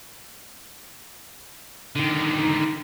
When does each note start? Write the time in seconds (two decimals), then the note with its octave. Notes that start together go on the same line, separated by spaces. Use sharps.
1.96 D3 D#3